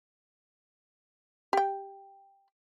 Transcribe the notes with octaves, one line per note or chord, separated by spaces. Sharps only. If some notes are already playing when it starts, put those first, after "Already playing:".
G4 G5